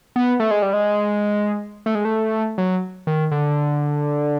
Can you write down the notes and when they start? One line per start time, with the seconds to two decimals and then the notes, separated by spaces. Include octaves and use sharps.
0.16 B3
0.40 A3
0.51 G#3
0.62 G3
0.73 G#3
1.86 A3
1.95 G#3
2.05 A3
2.58 F#3
3.07 D#3
3.31 D3